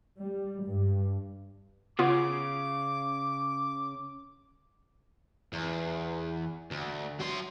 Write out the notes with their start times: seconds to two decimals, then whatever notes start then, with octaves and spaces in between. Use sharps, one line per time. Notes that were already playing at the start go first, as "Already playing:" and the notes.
0.20 G3
0.66 G2
1.99 C#3 B3 F4 D6
5.53 E2
6.71 D2
7.19 F#3 C6